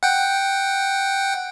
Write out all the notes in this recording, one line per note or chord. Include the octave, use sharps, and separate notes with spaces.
F#5 G5